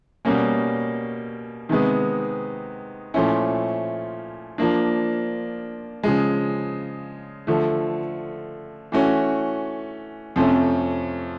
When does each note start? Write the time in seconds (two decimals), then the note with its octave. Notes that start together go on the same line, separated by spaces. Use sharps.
0.25 B2 G3 A#3 C#4
1.69 C3 D#3 G#3 B3
3.14 A#2 F3 A3 C#4 E4
4.58 F3 A#3 D4
6.04 C#3 F3 G#3
7.47 D3 F3 A3
8.92 E3 A3 C#4 F#4
10.36 F2 C3 F3 A3 C#4